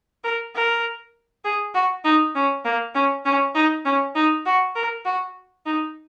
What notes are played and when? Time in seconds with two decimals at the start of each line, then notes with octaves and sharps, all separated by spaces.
0.24 A#4
0.55 A#4
1.45 G#4
1.75 F#4
2.04 D#4
2.35 C#4
2.65 A#3
2.95 C#4
3.25 C#4
3.55 D#4
3.85 C#4
4.15 D#4
4.46 F#4
4.75 A#4
5.05 F#4
5.66 D#4